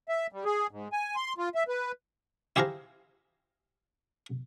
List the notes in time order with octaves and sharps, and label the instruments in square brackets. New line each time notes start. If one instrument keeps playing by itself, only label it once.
[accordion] E5
G3
G#4
G#2
G#5
C6
F4
E5
B4
[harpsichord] E4 G4 G#4 C5 F5 A#5